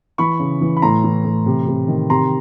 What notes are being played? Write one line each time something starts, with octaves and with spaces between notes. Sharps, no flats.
E3 B5 C#6
C#3
E3
B5
A2 A#5 C6
E3
A2
C3
C3
D#3
C3 A#5 C6